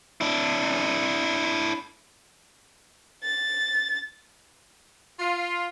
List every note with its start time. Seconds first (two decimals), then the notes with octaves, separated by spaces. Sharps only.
0.21 D4 E4
3.24 A6
5.20 F4